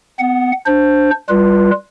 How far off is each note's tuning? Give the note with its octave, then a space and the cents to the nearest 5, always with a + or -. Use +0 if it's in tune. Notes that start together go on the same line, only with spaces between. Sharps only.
B3 +35 F#5 +0
D4 +0 C5 +0
G3 +0 F4 +0 B4 -20